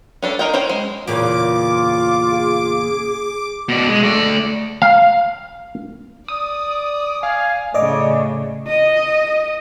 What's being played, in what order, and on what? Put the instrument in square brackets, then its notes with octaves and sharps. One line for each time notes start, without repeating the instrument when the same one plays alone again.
[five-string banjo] C#4 D4 A4
D#4 A#4 D#5 G5
C#4 E4 C5 G5
G#3
[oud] E2 A#2 C#3 [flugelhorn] F4 [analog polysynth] D6
[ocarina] G#4
[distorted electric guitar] B2 D5
G#3
A3 D5
[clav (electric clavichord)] F5
[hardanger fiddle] D5 [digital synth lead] D#6
[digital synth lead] F5 [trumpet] G#5
[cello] A2 C#3 [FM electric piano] D5 D#5 D6
[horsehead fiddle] D#5